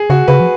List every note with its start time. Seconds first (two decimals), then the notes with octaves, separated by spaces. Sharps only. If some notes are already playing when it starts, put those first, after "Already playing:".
Already playing: G#4
0.10 C#3 F#4
0.28 C#3 B4
0.40 F3